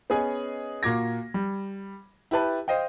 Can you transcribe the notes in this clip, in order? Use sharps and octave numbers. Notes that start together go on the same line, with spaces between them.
B3 C#4 G#4 D#5 G#5
A#2 A#3 F#4 D6 G#6 A#6
G3
E4 G4 B4 A5
C5 D#5 F5 G5